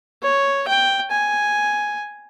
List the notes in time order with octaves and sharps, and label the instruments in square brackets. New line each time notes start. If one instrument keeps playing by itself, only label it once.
[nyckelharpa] C#5
G5
G#5